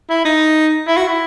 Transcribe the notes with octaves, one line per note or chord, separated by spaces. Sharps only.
E4
D#4
E4
F#4
E4